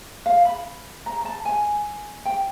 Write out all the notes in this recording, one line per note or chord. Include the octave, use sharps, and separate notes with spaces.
F5
B5
A#5
A#5
A5
G#5
G5